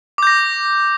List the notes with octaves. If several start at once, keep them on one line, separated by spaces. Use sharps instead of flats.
D6 G6 A#6